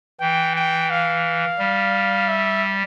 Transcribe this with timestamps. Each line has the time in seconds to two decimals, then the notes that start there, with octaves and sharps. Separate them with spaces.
0.20 E3 G5
0.56 G5
0.90 F5
1.59 G3
2.28 E5